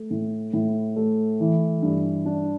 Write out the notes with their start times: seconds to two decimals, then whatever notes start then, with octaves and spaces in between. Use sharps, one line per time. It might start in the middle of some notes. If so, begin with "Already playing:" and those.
Already playing: A3
0.11 A2
0.53 A2
0.96 A3
1.40 E3
1.82 G2
2.26 D4